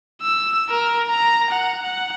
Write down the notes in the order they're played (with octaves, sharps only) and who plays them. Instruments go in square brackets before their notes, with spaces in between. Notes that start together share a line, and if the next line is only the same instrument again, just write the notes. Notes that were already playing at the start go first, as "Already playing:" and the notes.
[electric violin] E6
A#4
A#5
F#5
F#5